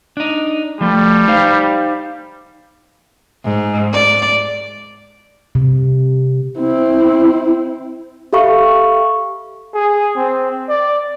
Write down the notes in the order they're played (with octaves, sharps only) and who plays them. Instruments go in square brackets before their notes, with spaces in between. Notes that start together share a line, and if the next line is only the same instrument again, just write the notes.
[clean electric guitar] D4 D#4
[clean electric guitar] F3 A3 [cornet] G3
[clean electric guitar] D#4 C5 F5
[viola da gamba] G#2
D5
[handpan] C3
[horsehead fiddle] C4 E4
[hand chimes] G4 A4 E5 F5 B5 C#6
[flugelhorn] G#4
C4
D5